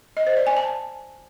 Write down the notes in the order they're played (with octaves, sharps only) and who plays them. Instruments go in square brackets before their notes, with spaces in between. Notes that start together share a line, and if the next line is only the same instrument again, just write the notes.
[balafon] D#5
C5
D5
G#5
A5